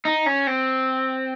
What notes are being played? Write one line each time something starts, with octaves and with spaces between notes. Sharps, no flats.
D#4
C#4
C4